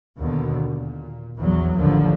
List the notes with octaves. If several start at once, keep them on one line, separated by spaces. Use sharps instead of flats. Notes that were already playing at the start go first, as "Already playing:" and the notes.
D#2 B2 D3
A#2
A#1 E2 F#3
A1 D#2 D3 F3